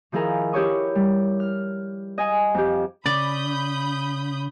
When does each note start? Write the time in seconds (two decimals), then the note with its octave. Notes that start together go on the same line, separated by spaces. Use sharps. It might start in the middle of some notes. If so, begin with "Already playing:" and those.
0.12 D#3 F3 E4 G#4 A#4
0.53 E4 G4 C#5 C#6 D#6
0.95 G3
1.40 F6
2.18 D#5 G#5
2.54 F2 G4
3.06 C#3 D5 B5 D#6 G6